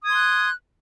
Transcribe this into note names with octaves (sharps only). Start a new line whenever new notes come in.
C6 D#6 F#6 G#6